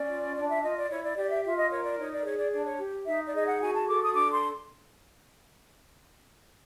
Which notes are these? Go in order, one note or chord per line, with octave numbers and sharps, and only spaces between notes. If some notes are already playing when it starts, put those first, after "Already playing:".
Already playing: C#4 D5
F4
D4 D5
E5
F4 D#5
D5
E4 C#5
D5
G4 D5
E5
F4 E5
D#5
A#4 C#5
D5
D#4 C#5
D5
G#4 C#5
D5
D4 D5
C#5
G4
D#4 E5
D5
G#4 D#5
F#5
F#4 G#5
A5
A4 D6
D#6
D4 D6
C6